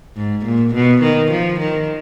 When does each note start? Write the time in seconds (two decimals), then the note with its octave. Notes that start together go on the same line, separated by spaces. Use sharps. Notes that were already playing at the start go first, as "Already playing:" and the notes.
0.16 G#2
0.45 A#2
0.74 B2
1.03 D#3
1.31 F3
1.60 D#3